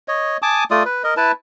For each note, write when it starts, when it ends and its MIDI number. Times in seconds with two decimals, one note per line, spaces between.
0.08 0.37 73
0.08 0.37 75
0.42 0.64 80
0.42 0.64 81
0.42 0.64 86
0.42 0.64 87
0.71 0.83 57
0.71 0.83 65
0.71 0.83 74
0.71 0.83 87
0.86 1.02 71
1.04 1.14 70
1.04 1.14 75
1.17 1.32 64
1.17 1.32 71
1.17 1.32 81